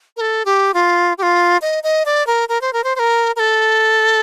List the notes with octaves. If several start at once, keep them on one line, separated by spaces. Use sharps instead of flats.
A#4
A4
G4
F4
G4
F4
D#5
D#5
D5
A#4
A#4
C5
A#4
C5
C5
A#4
A#4
A4